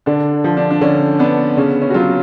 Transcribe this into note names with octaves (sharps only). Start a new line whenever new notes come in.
D3 D4
F3
D4
D4
D3 C#4
B3 D4
C#3 C#4
C#4
F#4
F#3 F4